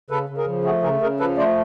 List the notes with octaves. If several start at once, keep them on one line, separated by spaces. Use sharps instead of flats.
C#3 A4 B4
C#3
G#4 A#4
F3
A3 F#4 G#4
C#3 G#4 A#4
C#3 G#4 A#4
F3 A4 B4
A3 C5 D5